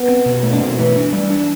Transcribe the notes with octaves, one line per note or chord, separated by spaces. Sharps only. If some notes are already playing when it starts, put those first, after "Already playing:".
Already playing: B3
C4
B2
A3 B3
D4
B2 C4
E3 A3
E3 D4
G3
D4